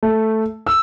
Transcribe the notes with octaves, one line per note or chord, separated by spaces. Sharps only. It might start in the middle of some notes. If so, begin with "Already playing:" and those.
A3
E6